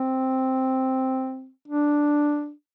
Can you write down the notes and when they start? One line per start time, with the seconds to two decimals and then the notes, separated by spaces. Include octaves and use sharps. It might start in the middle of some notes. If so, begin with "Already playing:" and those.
Already playing: C4
1.68 D4